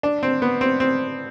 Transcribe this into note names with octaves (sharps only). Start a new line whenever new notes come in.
D4
C4
B3
C4
C4